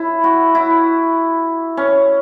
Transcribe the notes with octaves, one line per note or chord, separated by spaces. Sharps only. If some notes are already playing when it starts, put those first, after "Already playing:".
Already playing: E4
F#4
E4
C#4